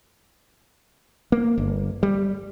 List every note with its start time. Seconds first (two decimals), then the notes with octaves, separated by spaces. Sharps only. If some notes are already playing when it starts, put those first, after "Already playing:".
1.32 A#3
1.58 G1
2.03 G3